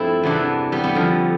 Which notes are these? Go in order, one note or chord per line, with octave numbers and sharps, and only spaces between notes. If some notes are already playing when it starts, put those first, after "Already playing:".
Already playing: G2 F3 A3 C4 E4
E2 C3 E3 B3 D4
G3 B3
G3 B3
F2 D3 F3